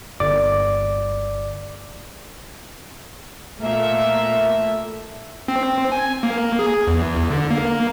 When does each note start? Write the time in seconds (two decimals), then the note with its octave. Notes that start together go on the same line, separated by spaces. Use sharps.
0.20 G1 D5 D6
3.60 A#2 A3 A#3 E5
5.48 C4
5.92 G#5
6.23 A#3
6.59 G#4
6.87 E2
7.30 D3
7.51 A#3